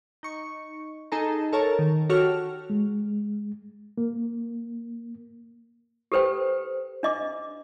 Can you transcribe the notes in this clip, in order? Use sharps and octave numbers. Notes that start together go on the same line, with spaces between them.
D#4 C#6
D#4 G#4 A4 A#5
A4 A#4 C#5 A5
D#3
F#4 G4 A4 C#5 F6
G#3
A#3
G4 A4 B4 C5 G5
D4 D#5 D6